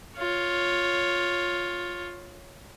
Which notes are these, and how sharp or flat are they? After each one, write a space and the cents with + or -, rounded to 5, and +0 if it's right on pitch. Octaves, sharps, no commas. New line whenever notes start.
F4 +10 C#5 +0